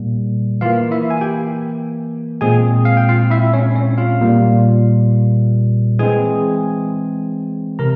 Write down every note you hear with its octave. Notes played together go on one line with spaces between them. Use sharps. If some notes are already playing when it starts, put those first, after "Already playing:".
Already playing: A#2 G3 A#3
E3 A#3 F4 F5
E4 E5
G#5
G4 G5
A#2 G#3 C4 G#4 G#5
F5
G5
F4 F5
E4 E5
C#4 C#5
C#4 C#5
F4 F5
A#2 G3 A#3
E3 G#3 C4 G#4 G#5
C3 A#4 A#5